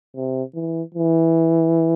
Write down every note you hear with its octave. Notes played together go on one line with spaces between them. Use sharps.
C3
E3
E3